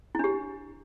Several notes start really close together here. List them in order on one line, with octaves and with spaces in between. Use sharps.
E4 D4 G4